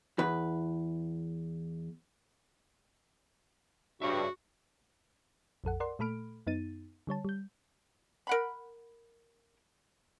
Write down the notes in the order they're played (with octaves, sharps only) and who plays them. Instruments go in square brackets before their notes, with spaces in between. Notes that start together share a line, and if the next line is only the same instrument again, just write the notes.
[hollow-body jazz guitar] E2 B4
[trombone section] G2 [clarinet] F#4 [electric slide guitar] G#4 C#5 E5
[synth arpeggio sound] A#1 F2 A4 F#5
A#4 D5 F#5 C6
A#2 A3 A4 B5 F6 D7
F#2 B3 D#4 A6 D#7
D3 G3 C#5 A5
G3 G6
[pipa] A#4 F#5 B5